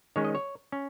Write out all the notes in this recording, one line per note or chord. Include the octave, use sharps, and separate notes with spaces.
D#3 G#3 C#4 C#5
D#5
C#5
C#4